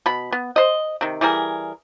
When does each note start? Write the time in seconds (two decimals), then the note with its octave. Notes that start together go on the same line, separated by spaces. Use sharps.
0.06 B2 B5
0.32 B3
0.56 C5 D#5
1.01 C3 D#3
1.21 E3 G3 G#4 A#4